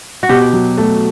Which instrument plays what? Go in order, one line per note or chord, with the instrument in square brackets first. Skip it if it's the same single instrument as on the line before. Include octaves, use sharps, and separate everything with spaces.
[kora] F#4
[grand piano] B2 [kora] G4
[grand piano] F#3
A3